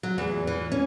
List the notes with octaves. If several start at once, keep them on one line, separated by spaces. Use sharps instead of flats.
F#3
E2
E3
C#4